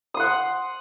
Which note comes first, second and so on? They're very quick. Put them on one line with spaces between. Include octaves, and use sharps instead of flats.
D#6 C6 F#5